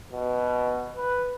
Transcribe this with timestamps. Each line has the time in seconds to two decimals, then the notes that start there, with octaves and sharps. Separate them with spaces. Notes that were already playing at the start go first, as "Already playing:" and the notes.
0.13 B2
0.96 B4